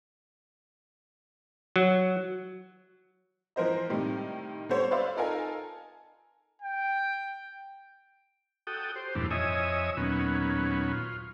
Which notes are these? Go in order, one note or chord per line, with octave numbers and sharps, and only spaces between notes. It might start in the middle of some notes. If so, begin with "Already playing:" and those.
F#3
E3 F3 A#4 C5 D#5
A2 C3 D#3 G3
D3 G3 B3 C5 C#5
B4 C5 D5 E5 F5 C6
D#4 F4 A4 A#4 F5 G#5
G5
F#4 A4 G5 D#6
G4 C5
E2 G2 A#2 E3 A3 D4
F2 C#5 D#5 E5 G#5 D#6
D#2 A#2 F#3 B3 C#4
F4